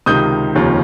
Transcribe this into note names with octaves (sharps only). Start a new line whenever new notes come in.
C#2 C3 D#3 D#6 G6
F1 D#2 C#3 F3